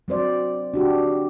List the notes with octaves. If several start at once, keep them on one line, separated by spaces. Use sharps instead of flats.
F#3 C4 C5 D5
D4 F#4 G4